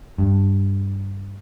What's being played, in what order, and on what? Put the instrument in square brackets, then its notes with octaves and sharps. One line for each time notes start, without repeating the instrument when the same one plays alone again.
[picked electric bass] G2